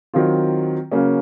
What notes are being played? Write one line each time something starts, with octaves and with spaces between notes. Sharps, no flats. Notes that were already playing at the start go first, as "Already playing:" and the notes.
D#3 F#3 C4 F4
C#3 F#3 A#3 C#4